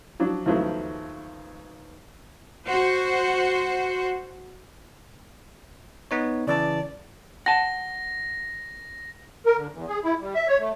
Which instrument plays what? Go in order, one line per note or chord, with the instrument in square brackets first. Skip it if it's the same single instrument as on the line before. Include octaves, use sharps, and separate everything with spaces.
[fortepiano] F3 F#3 D4
D#2 C#3 F3 F#3 A3 B3
[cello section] F#4 C5
[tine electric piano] B3 D#4 C#5
[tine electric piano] C#3 E3 A5 [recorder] D5
[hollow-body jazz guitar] F#5 A5 [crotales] A#6
[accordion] A#4
D3
E2
G#4
E4
G3
E5
C#5
A3